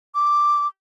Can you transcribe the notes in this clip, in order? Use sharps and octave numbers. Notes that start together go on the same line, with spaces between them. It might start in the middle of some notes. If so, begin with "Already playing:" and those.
D6